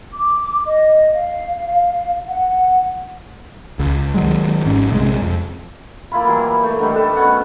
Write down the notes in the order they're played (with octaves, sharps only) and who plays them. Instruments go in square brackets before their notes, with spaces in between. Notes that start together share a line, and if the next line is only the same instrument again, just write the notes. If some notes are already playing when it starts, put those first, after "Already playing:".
[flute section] D6
D#5
F5
F#5
[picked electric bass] C#2
D#3 F#3 G#3
G#1 G#2 C#4
A#1 C3 D#3 G#3
F2
[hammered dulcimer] A#3 E4 F4 B5
E3 F#3 G3
A3
D3 D#3 G3
A4 B4
B2 C#4 F#5